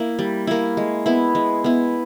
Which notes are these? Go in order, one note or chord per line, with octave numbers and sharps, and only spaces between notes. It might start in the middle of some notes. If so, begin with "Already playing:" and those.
Already playing: A#3 E4
G3
A#3 E4
G#3
B3 E4
G#3
B3 E4